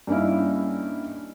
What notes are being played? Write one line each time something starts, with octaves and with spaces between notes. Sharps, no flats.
G2 A#3 C#4 D#4 E4